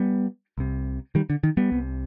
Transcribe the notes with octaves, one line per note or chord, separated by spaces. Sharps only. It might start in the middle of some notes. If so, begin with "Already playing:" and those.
Already playing: G3 B3
C2 C3
D#3 G3
D3
D#3
G3 B3
C2 C3